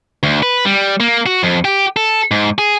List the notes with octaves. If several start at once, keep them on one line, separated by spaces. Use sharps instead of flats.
D2
B4
G3
A#3
F#4
F2
G4
A4
G#2
G#4